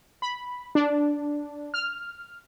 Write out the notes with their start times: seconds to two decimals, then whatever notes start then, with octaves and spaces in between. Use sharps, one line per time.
0.22 B5
0.75 D4
1.74 F6